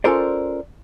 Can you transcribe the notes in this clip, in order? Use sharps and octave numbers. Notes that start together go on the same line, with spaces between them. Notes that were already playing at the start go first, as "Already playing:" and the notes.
C#4 F4 A4 A#4 C5 D5